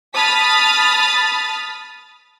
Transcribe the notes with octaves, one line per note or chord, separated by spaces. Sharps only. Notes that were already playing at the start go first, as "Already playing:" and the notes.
A5 B5 D#6 F6 A6 B6